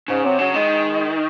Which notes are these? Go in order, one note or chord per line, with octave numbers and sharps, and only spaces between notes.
G#2 C#3
C3 F#3
C#3 F#3
D#3 G#3